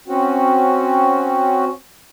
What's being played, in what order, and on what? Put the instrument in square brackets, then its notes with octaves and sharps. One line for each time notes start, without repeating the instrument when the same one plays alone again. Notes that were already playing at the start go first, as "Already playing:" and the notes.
[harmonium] C4 C#4 F#4